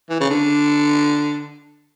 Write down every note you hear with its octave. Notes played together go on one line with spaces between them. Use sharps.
E3
C#3
D3